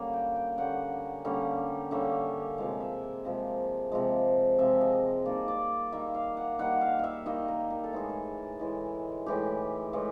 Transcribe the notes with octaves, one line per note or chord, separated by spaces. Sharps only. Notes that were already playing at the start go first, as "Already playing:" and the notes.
Already playing: D3 G3 A#3 C#4
G5
G5
D3 G3 A#3 C#4 F#5
D3 G3 A#3 C#4
D3 G3 A#3 C#4 E5
C3 F3 G#3 F5
E5
C3 F3 G#3
C3 F3 G#3
C3 F3 G#3 E5
D#5
D#3 G3 A#3 D5
D5
D#3 G3 A#3 E5
F5
F#5
D#3 G3 A#3 F#5
F5
E5 F5
D#3 G3 A#3 D#5
A#4
A#4
A4
A2 E3 G#3 G#4
A4
A2 E3 G#3
A2 E3 G#3 G4
A2 E3 G#3